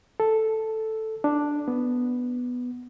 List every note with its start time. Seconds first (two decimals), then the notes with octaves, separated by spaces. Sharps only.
0.20 A4
1.24 D4
1.68 B3